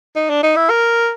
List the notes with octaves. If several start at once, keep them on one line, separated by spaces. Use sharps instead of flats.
D#4
D4
D#4
E4
A#4